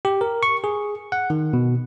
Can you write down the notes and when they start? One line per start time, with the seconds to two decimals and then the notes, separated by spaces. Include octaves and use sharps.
0.05 G4
0.21 A#4
0.43 C#6
0.64 G#4
1.12 F#5
1.30 D#3
1.53 B2